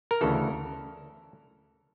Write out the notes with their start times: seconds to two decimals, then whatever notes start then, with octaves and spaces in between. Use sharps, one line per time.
0.11 A#4
0.21 D2 C#3 E3 A4